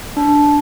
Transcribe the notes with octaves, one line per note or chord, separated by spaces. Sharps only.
D4